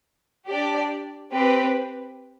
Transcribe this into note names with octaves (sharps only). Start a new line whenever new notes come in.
D4 G4 D5
C4 G4 B4